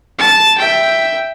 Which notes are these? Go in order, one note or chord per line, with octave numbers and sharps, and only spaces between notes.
A5
E5 G5